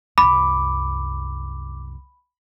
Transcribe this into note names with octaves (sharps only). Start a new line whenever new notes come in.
C2 F#2 B5 D6